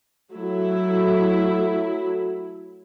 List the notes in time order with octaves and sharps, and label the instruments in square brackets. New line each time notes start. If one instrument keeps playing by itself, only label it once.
[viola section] F#3 A3 E4